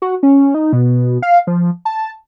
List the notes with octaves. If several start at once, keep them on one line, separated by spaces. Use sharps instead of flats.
F#4
C#4
D#4
B2
F5
F3
A5